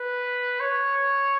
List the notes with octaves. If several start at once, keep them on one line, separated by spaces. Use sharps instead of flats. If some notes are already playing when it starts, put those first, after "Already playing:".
Already playing: B4
C#5